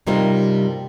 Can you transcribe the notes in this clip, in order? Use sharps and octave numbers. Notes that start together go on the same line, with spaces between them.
G2 C3 G3 A#3 D#4 F4